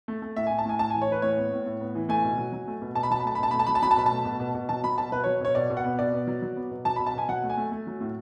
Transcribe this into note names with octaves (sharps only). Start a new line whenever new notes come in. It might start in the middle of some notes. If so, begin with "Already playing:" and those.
A3
A3
A2 E5
G#5
A2
A5
A2 G#5
A2 A5
G#5
E3
C#5
E3 B4
A2 C#5
B3
A2
A2
B3
E3
A3 G#5
B2
F#3
F#3
A3
B2
B2 A5
B5
F#3 A5
B5
A3 A5
B5
B2 A5
A3 B5
A5
F#3 B5
A5
F#3 B5
A5
B2 B5
A3 A5
B2
B2
B2
F#3 A5
F#3 B5
B2 A5
F#3 B4
F#3 C#5
B2 C#5
B2 D5
B2
F#5
B3
B2 D5
B3
F#3
F#3
B3
B2
F#3 A5
B5
B2
A5
B2 G#5
F#3 F#5
A3
G#5
A3
A3
F#3
A2